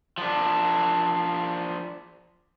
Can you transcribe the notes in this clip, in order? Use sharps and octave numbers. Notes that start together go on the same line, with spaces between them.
F3 D4